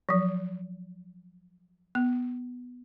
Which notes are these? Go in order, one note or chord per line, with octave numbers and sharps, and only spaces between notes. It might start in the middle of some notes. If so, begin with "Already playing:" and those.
F3 F#3
B3